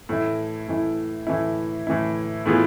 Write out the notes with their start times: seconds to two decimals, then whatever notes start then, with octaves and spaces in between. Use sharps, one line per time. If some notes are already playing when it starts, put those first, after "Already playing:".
0.09 A2 E3 A3 E4
0.68 A2 E3 A3 E4
1.27 A2 E3 A3 E4
1.87 A2 E3 A3 E4
2.46 A2 E3 B3 F4 G#4